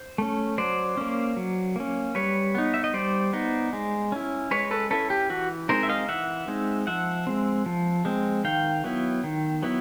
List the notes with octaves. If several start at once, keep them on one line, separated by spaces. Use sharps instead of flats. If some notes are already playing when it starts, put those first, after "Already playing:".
Already playing: C5
A3 C#4
F#3 C5 D5
A#3 C#4
F#3
A#3 C#4
G3 B4 C#5
B3 D#4
E5
D#5
G3 C5 D5
B3 D#4
G#3
C#4 E4
G#3 B4 C#5
A4 B4
C#4 E4 A4 B4
G4
E3 F#4
G#3 C4 D#4 A#4 C5
E5
D#5 F5
E3 E5 F#5
G#3 C4 D#4
F3 E5 F#5
G#3 C4
F3
G#3 C4
D#3 F5 G5
F#3 B3 E4
D#3
F#3 B3 E4